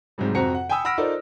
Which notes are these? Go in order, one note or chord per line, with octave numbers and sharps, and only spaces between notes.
G#2 C3 F#3 G3
F2 C4 F#4 A#5 C#7
F#5
G5 G#5 B5 D#6 E6
F#5 B5 E6 F6 A#6 D7
D#4 F4 A4 A#4 C5 D5